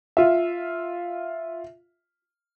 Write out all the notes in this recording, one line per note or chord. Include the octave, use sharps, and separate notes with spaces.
F4 E5